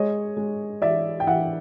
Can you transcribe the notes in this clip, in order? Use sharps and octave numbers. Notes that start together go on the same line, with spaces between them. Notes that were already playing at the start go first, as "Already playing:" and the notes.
Already playing: G#3 C#5 D#5
G#3
E3 D5 E5
G5
E3 E5 F#5